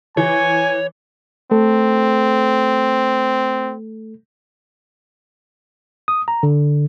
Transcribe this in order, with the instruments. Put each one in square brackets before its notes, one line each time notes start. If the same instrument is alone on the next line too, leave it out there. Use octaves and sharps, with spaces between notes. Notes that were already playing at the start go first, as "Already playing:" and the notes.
[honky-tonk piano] E3 [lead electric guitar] C#5 [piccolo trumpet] G#5
[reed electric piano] A3 A4 [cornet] C4
[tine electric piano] D#6
A#5
D3